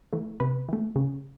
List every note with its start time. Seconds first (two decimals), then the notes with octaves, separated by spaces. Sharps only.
0.13 E3 A3
0.40 C3 B4
0.69 E3 A3
0.96 C#3